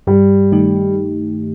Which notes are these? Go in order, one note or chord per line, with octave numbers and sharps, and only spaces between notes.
G2 G3
D#3 A3 D#4 G4